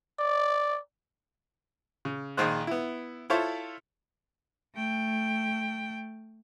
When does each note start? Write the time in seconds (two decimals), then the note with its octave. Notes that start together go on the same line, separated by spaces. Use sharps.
0.19 D5
2.05 C#3
2.37 A#1 D#3 G#4 C5 F#6
2.67 B3 E4
3.30 E4 F4 A4 C5 C#5 E5
4.75 A3 G5